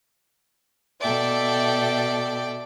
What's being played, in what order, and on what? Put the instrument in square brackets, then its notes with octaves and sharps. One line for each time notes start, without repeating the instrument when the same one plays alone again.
[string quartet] B2 A4 E5 [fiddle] D5 G5